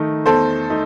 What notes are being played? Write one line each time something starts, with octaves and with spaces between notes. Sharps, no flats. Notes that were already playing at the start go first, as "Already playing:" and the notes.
Already playing: D#3 A3 D#4
E2 A4 C5
A3 D#4